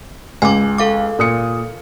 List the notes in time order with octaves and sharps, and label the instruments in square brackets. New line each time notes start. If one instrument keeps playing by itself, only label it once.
[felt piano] C#2 [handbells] G#5 D6
[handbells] A4 F5 D6
[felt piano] A#2 D#6 C#7